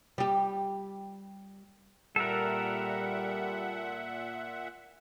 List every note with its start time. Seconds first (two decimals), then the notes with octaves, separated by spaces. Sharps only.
0.18 G3 G4
2.16 A#2 G3 A4 A#4 E5 F#5